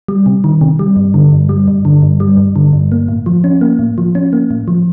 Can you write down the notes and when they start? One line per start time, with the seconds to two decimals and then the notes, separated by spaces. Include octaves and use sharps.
0.08 G3
0.26 C3
0.44 D#3
0.61 C3
0.79 G3
0.96 G2
1.14 D3
1.32 G2
1.49 G3
1.67 G2
1.85 D3
2.02 G2
2.20 G3
2.37 G2
2.56 D3
2.73 G2
2.92 A#3
3.09 A2
3.26 F3
3.44 C#4
3.61 A#3
3.79 A2
3.98 F3
4.15 C#4
4.33 A#3
4.51 A2
4.68 F3